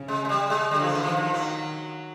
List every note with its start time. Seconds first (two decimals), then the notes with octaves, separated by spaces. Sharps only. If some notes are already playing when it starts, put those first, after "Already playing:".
Already playing: C#3
0.08 G#3
0.25 G#3
0.29 G3
0.50 G#3
0.71 D3 G3
0.80 F3
0.87 F#3
0.95 E3
1.03 D#3 F3
1.18 F3
1.34 F#3